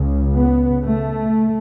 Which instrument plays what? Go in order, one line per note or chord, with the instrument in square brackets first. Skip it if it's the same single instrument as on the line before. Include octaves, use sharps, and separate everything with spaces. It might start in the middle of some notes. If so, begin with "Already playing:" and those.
Already playing: [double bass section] C#2 C#3
B3
A3